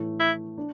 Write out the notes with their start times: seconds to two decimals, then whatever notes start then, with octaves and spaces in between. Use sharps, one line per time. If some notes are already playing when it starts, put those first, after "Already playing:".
Already playing: A2 E3 A3
0.20 E4
0.58 D4